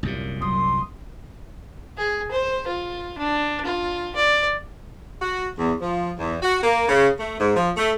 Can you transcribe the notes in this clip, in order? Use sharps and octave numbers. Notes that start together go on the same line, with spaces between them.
C2 F#2 A#2
F#3 C6 D#6
G#4
C5
F4
D4
F4
D5
F#4
E2
F3
E2
F#4
A#3
C#3
A3
G#2
F3
A3